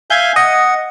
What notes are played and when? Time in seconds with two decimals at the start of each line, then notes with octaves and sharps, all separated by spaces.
0.10 E5 F5 G#5 G6 G#6
0.36 D#5 F#5